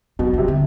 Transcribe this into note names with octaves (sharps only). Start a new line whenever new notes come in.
B2 F#3
C3 E3
D3